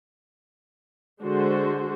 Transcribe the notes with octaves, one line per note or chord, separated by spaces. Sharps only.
D3 G#3 F#4 C5